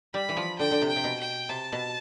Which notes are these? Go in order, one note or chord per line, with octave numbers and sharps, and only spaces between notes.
G3 B5
E3
F3
D3 G5
D3
C3
G5
C3
B2
G5
C3 A5
B2